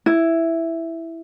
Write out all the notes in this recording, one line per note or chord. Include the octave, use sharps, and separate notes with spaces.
E4